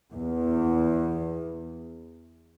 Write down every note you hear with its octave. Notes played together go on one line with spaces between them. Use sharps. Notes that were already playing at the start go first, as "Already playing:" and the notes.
E2